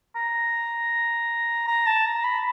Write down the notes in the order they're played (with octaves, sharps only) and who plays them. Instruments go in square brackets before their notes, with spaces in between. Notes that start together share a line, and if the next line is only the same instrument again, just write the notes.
[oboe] A#5
A#5
A5
A#5
B5